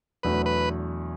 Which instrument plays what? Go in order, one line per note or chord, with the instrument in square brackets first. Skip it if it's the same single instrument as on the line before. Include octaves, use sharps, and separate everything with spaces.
[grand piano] E2 B2 F#3 A3 D4 [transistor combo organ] B4
[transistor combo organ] B4